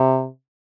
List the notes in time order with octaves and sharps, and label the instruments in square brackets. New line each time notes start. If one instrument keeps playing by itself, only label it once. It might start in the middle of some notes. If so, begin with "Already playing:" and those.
Already playing: [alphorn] C3